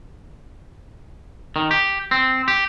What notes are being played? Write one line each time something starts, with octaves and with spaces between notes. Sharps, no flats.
D#3
G4
C4
G4